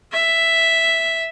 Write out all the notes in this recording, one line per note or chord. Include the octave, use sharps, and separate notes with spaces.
E5